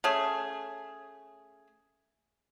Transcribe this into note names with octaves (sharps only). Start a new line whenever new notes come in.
A3 C#4 G#4